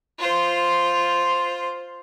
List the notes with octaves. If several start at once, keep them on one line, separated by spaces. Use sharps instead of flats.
F4 C5